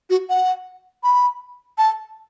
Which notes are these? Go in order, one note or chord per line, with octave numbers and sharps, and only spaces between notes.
F#4
F#5
B5
A5